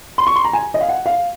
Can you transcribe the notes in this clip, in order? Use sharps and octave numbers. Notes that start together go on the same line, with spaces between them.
C6
C#6
C6
A#5
G#5
D#5
F5
F#5
F5